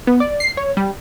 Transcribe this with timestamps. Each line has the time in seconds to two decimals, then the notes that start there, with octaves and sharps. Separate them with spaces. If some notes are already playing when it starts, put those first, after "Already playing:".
0.07 B3
0.20 D5
0.40 C7
0.57 C#5
0.77 G3